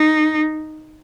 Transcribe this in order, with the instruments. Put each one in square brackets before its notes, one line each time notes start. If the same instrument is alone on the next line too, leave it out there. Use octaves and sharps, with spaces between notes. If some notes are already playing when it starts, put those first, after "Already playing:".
Already playing: [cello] D#4